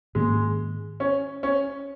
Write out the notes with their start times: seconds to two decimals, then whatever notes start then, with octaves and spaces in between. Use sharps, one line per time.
0.15 G#2 D#3 G#3 A#3 C#4
1.00 C#4
1.43 C#4